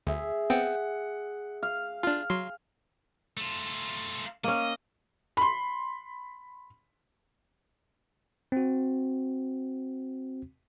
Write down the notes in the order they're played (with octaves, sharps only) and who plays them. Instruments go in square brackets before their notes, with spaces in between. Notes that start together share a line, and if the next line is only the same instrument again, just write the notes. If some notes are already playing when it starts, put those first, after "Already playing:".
[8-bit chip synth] D2 [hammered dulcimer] G#4 E5
[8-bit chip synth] B3 C4 G5 [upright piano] F#5
[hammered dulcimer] F5
[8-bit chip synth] D4 F4 [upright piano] F6
[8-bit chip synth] F#3 C6
[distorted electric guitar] A3 F4
[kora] A#3 C#4 [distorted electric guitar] D#5
[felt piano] B5 C6
[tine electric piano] C4 F#4